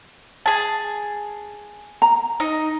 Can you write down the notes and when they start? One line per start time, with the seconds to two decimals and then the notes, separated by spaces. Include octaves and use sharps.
0.46 G#4 A5
2.02 A#5
2.40 D#4